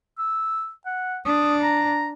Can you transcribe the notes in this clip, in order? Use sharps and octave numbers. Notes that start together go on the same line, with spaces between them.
E6
F#5
D4 D#6
A#5